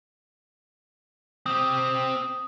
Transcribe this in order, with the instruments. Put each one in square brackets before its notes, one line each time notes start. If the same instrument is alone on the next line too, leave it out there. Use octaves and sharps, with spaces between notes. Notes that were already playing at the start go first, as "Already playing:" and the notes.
[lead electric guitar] C4 G4 [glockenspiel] D#6